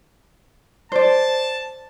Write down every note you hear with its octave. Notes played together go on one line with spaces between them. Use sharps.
C5 D5 A5